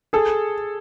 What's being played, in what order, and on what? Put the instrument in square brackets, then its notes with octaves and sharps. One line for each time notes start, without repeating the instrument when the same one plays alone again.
[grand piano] G#4 [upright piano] A4